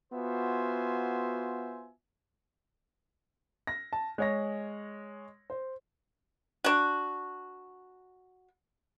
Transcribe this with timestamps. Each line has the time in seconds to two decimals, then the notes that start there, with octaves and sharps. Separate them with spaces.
0.13 B3 F4 F#4 C5 E5 G#5
3.67 A#6
3.93 A5
4.18 G#3 C#5 A#6
5.50 C5
6.64 D4 F#4